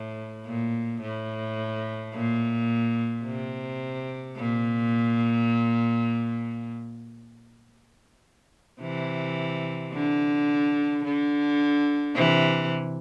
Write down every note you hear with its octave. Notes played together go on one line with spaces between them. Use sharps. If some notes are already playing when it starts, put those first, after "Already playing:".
Already playing: A2
A#2
A2
A#2
C3
A#2
C3 E3
D3
D3
C3 E3